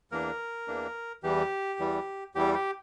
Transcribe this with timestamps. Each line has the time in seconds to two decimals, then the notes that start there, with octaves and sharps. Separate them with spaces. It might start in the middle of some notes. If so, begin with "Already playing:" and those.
0.12 E2 E3 A#3 D4 A#4
0.68 E2 E3 A#3 D4
1.23 E2 E3 G3 G4
1.79 E2 E3 G3
2.35 E2 E3 G3 G4
2.54 G4